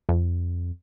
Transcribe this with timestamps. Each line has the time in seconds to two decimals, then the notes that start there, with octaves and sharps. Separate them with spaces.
0.09 F2